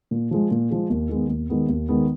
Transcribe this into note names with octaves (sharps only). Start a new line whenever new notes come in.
A#2
F3 G#3
A#2
F3 G#3
D#2
D#3 G#3 B3
D#2
D#3 G#3 B3
D#2
D#3 G#3 B3